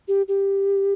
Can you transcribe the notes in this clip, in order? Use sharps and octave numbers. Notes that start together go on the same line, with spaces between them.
G4
G4